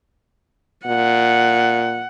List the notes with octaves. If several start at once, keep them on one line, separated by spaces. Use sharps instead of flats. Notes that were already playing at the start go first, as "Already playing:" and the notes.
A#2 F#5